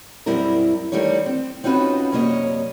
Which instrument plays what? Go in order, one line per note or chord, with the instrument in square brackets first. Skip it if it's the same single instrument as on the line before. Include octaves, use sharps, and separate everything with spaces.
[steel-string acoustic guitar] F#2 B2 G3 C4 E4 A#4
D#3 E3 G3 A3 D4 C#5
C4
C4 C#4 D#4 F4 F#4 B4
F#2 C3 G3 A#3 C#5 D#5